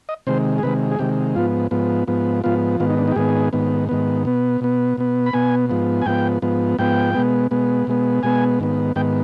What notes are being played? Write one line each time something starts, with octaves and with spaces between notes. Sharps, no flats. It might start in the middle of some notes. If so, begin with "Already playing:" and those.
D#5
C3 D#3 G#3 C5
G#4
C3 D#3 G#3 B4
G#4
C3 D#3 G#3 G4
G#2 F3 B3 F4
G#2 F3 B3
G#2 F3 B3
G#2 F3 B3 F4
G#2 D#3 B3 F4
D#4
D4
D#4
G4
G#2 D#3 B3 G#4
G#2 D#3 B3
G#2 D#3 B3
B2 B3
B2 B3
B2 B3
B5
B2 B3 G#5
G#2 F3 B3
G#5
G#2 F3 B3 G5
G#2 F3 B3
G#2 F3 B3 G5
B2 G#3 B3
B2 G#3 B3
B2 G#3 B3
B2 G#3 B3 G#5
G#2 D#3 B3
G#2 D#3 B3 G5